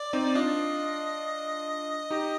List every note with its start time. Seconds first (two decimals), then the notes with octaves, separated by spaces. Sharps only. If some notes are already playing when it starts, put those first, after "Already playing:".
Already playing: D5
0.13 C4 D#4
0.35 D4 F4 D#5
2.10 D#4 G4